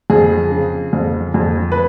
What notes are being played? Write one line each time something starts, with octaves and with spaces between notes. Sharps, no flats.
F2 G#4
C#3
F2
F2
B4